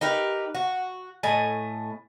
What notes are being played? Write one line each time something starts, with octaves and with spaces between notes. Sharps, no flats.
D#4 G4 A#4 B4
F#4
A2 A3 D#5 G#5